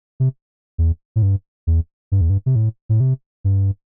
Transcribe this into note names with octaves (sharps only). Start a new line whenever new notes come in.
C3
E2
A2
G2
E2
G2
E2
G2
C3
A2
A2
C3
G2